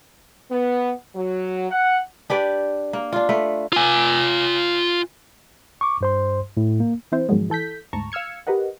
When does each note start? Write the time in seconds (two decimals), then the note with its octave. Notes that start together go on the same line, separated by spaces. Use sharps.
0.51 B3
1.14 F#3
1.70 F#5
2.30 D4 G4 B4 D5
2.93 A#3
3.13 D4 F4
3.29 A3 B4
3.73 F4 G#5
5.81 C#6 D6
6.01 G2 C5 C6
6.57 A2
6.80 A#3
7.12 E3 C4 E4 C5
7.29 G#2 B2 D#3 F3 F#3 G#3
7.50 E3 A4 G6 B6
7.93 D2 G#2 A5 A#5 C#6
8.12 F5 E6 F6 G#6 C#7
8.47 G4 A#4 B4 D#5 F#5